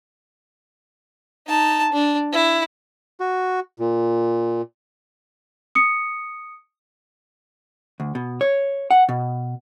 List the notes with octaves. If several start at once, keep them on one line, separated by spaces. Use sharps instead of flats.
D#4 A5
D4
E4
F#4
A#2
D#6 C#7
D2
B2
C#5
F#5
B2